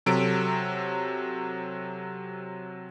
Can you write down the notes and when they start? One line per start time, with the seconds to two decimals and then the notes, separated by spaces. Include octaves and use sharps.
0.06 C3 F#3 A4 D7